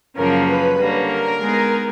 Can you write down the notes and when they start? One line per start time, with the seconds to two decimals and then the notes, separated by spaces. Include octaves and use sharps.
0.17 F#2 C#3 F3 A#3 C#4 A#4
0.48 B4
0.79 D3 G3 A#3 C#4
1.10 A#4
1.40 G#3 B3 D#4 G#4